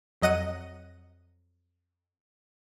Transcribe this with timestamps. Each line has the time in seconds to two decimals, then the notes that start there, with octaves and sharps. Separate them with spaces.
0.22 F2 F#3 D#5 F#5 D#7